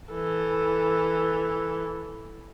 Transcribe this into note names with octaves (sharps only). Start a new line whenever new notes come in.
E3 A4